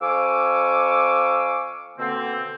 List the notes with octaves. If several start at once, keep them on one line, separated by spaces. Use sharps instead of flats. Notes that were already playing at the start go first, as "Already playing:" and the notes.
F2 F5 G#5 C#6 D6 E6
B2 D3 A#3 C4